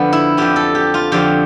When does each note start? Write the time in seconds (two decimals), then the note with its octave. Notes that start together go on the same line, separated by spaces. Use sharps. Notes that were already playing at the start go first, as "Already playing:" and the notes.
Already playing: F2 D3 F3 B3
0.13 E4
0.37 F2 D3 F3 G4
0.56 A4
0.75 G4
0.94 F4
1.12 F2 D3 F3 G4